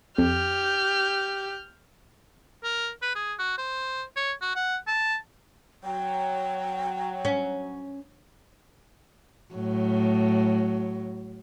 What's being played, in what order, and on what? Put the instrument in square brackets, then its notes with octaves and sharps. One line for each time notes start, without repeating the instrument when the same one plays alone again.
[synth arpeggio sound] F2 [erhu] G4 [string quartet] F6 G6
[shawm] A#4
B4
G#4
F#4
C5
C#5
F#4
F#5
A5
[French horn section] F#3 [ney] G5
[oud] C#4
[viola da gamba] A2 F#3